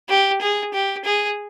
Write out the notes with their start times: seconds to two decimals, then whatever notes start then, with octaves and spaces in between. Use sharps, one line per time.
0.09 G4
0.41 G#4
0.74 G4
1.05 G#4